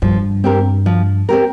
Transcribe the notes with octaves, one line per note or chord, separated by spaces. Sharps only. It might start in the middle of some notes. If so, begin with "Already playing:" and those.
G2 F3
C4 G4 A#4
F3
C4 G4 A#4